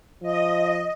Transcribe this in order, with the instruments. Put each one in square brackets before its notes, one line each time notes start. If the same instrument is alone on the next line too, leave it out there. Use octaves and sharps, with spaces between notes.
[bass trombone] F3 [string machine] D#5